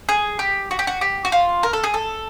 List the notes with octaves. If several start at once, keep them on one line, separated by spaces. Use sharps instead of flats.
G#4
G4
F#4
G4
F#4
G4
F#4
F4
A#4
A4
G#4
A4